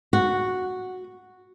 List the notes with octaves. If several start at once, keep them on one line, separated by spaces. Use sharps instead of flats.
F#4